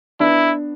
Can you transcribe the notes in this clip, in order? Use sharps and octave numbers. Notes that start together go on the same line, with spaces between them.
B3 D4 E4